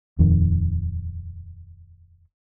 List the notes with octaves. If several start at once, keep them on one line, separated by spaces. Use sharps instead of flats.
D#1 F2 D#3